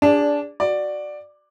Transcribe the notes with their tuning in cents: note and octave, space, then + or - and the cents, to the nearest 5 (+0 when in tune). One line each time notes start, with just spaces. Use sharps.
D4 -15 G#4 -30 D5 +0
F#4 +0 D5 +10